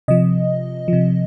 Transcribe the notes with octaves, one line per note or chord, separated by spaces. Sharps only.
C3 F3 D#5
C3 F3